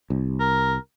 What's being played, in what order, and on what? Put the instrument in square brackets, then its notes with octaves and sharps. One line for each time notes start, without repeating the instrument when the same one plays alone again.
[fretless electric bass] C2
[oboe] A#4